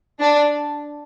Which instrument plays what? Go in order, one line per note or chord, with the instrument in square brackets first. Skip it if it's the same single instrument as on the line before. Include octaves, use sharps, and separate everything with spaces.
[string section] D4